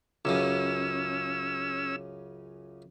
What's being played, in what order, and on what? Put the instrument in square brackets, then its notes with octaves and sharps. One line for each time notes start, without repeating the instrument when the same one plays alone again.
[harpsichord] C#2 F#2 C#3 [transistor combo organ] C#4 E6